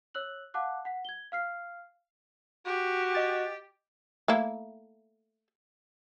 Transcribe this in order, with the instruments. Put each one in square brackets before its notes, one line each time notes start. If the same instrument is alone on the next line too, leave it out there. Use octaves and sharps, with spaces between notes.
[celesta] C#5 E6 F#6 F#7
F5 F#5 A5 D6 F#6
F#5 B6
G#6 G7
F5 F6 C7
[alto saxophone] F#4 [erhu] G4
[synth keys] D#5 A6
[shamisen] A3 A#3 E4